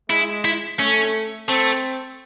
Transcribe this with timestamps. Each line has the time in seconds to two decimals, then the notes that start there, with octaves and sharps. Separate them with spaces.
0.10 G#3 E4
0.45 E4
0.79 A3 C#4
1.49 A3 C4